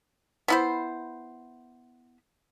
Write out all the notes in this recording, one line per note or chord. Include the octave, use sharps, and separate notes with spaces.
B3 E4 C5